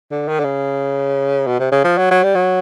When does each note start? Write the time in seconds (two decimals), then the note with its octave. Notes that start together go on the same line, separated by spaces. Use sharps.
0.11 D3
0.28 D#3
0.39 D3
0.44 C#3
1.47 B2
1.59 C3
1.72 C#3
1.84 F3
1.98 F#3
2.11 F#3
2.23 G3
2.35 F#3